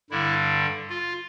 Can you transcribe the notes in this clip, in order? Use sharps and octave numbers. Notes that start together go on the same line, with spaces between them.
G2 D3 G3 E4
F4